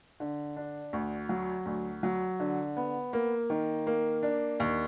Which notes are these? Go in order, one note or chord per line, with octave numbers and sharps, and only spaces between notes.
D3
D4
D2
F#3
D2
F#3
D3
B3
A#3
D#3
A#3
D4
D#2